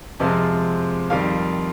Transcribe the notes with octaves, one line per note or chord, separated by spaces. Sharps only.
F2 C3 F3 G#3
F2 D#3 G3 F5